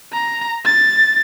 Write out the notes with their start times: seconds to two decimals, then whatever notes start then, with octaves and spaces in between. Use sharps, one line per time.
0.13 A#5
0.66 A6